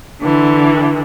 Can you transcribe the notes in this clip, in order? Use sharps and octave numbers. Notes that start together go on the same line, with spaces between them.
D3 E3